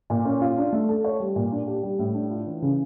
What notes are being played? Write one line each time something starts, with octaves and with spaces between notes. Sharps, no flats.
A#2
C#4
F4
D4
A3
A4
C#5
G3
A#2
D4
G4
G3
A2
D4
F4
E3
C#3